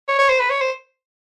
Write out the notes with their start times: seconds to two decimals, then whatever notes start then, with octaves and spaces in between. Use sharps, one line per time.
0.08 C#5
0.19 C#5
0.29 C5
0.39 B4
0.50 C#5
0.61 C5